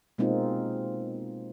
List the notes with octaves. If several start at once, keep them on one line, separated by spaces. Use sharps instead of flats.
B2 G#3 A#3 C4 D#4 F4